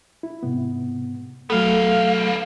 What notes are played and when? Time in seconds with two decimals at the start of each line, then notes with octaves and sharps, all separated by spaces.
0.23 E4
0.43 G#2 C3 B3
1.50 F#3 A3 B3 A4 F5